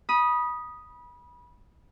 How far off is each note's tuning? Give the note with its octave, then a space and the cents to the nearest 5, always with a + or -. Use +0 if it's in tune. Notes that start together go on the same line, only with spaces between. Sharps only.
B5 -25 D#6 +0